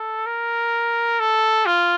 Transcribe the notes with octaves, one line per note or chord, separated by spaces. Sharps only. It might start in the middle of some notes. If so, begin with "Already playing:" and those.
Already playing: A4
A#4
A4
F4